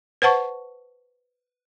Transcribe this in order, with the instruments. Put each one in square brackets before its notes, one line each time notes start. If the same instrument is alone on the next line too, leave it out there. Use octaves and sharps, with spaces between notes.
[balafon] B4 C5 F#5 A5 C#6